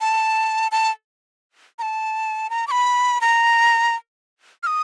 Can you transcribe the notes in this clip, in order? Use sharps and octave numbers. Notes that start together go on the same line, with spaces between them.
A5
A5
A#5
A5
A#5
D6
B5
A#5
F6
D#6